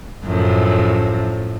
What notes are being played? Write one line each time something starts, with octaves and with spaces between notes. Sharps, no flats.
F#2 A2 F3